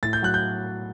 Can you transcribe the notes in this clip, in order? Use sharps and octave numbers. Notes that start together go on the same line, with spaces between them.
A2 A6
G6
F#3 F#6
G6